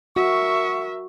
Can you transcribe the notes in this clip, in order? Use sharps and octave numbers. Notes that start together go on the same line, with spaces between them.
F#4 A#4 E5 C#6